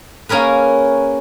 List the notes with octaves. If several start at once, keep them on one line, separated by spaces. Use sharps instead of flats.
A#3 C#4 G#4 A#4 B4